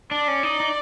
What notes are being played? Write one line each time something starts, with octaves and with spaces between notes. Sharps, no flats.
D4 D5
C#4
D#4
D#4